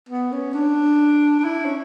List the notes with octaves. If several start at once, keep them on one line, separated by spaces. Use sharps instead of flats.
B3
C#4
D4
D4
E4
C#4